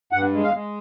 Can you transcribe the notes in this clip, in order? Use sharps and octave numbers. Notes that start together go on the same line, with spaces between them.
G2 F#5
G#3
F5
G#3